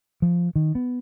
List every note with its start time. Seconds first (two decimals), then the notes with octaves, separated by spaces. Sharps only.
0.22 F3
0.56 D#3
0.75 B3